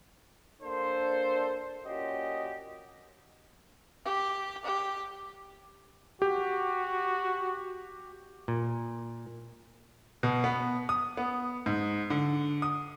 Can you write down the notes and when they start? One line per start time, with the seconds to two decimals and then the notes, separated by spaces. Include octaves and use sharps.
0.62 A#3 D4 A4 C5
1.86 A#2 C#4 F#4 G4 D#5
4.05 G4
4.65 G4
6.22 F#4 G4
8.48 A#2
10.23 B2
10.44 B3
10.89 D#6
11.17 B3
11.66 G#2
12.10 D3
12.62 D#6